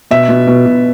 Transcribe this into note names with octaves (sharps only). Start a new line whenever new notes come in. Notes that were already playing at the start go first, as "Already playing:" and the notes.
B2 E5
B2
B2
B2